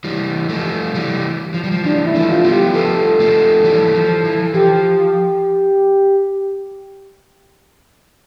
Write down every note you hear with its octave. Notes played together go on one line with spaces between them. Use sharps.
E3 G3
F3 A3
E3 G3
F3
G3
F3
E3 G3 D4
E4
F3 A3
F4
G3 B3
G4
F3 A3 A4
F3 A3
E3 G3
F3
E3
F3 G4